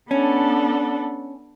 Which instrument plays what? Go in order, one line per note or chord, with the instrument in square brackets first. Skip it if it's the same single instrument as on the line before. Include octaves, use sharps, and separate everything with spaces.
[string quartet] B3 D4 A4 [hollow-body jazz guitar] C#4